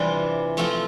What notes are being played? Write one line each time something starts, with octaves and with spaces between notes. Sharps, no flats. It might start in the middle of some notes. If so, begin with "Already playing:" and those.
Already playing: C3 E3 G3 D4 F4
F3 A3 C4 F4